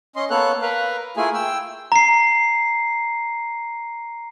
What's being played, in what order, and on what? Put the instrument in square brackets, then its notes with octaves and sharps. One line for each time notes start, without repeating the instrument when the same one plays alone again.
[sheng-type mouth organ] C#4 D#5 C6
A#3 B3 A4 C#5 F#6
A#4 B4 F5
A3 A#3 E4 F4 G#4 G#5
G5 E6
[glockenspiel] A#5 C7